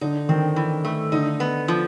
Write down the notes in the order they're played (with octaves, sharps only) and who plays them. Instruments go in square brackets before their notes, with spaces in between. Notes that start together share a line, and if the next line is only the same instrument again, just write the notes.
[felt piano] D3 [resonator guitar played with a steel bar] D#4
[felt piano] D#3 [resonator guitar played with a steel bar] C4
[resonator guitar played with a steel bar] E3
A3
[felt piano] D3 [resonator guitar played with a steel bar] D#4
[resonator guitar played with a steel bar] B3
F3